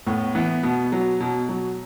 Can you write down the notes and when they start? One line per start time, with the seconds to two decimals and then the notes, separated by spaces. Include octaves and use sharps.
0.07 A2 B3
0.35 E3 B3
0.63 B2 B3
0.92 F#3
1.20 B2
1.49 F#3